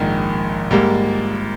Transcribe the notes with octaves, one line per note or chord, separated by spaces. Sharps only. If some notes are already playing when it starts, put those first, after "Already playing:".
Already playing: A#1 G#2 D#3
G#2 G3 A#3